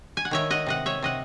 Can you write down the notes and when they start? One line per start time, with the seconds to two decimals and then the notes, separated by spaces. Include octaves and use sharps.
0.17 G#5
0.25 F#5
0.31 D#3 C#5 E5
0.50 D#5 F#5
0.66 C3 D#5 F#5
0.86 C#5 E5
1.02 C3 D#5 F#5